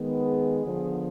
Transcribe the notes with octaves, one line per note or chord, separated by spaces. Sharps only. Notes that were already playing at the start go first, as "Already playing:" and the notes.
Already playing: D#3 G#3 B3
G#4
D3 F3 B3